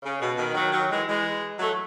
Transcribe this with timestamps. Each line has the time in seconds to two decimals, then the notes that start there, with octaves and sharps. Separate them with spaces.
0.02 C#3
0.20 B2
0.37 B2 D#3
0.54 D#3 F#3
0.72 D#3 F#3
0.89 E3 G#3
1.07 E3 G#3
1.59 F#3 A3